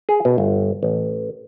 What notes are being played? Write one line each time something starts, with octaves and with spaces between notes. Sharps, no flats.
G#4
B2
G1
A1